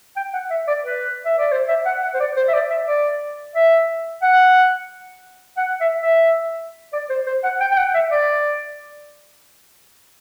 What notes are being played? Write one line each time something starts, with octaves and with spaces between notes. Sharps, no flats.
G5
F#5
E5
D5
B4
E5
D5
C5
E5
F#5
F#5
C5
D5
C5
E5
D5
E5
D5
E5
F#5
F#5
E5
E5
D5
C5
C5
F#5
G5
G5
F#5
E5
D5